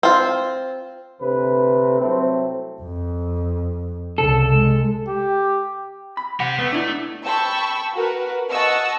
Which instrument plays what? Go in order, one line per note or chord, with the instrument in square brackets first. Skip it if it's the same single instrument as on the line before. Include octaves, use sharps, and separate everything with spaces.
[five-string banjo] C4 F4
[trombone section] D2 B4 [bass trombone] C3
[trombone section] C2 F#3 A3 [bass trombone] C4
[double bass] F2
[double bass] C2 C#3 [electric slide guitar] A4
[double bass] G#3
[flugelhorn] G4
[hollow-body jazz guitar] B5
[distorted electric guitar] C4 G4 [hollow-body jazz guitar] F#5
[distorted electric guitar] A3 [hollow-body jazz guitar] B3
[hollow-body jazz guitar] D4 E4
[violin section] G5 A5 B5 C#6 E6
F#4 A#4 B4
D#5 F#5 A5 C#6 E6